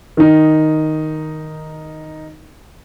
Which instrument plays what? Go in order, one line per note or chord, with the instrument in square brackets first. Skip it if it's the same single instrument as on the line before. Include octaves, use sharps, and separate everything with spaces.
[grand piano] D#3 D#4